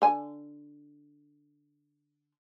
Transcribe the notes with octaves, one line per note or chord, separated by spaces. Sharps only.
D3 G#5